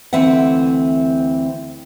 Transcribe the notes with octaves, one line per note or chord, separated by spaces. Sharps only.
D2 E3 C4 E5 F#5